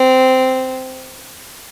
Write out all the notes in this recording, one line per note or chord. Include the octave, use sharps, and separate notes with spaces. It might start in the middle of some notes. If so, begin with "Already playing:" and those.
Already playing: C4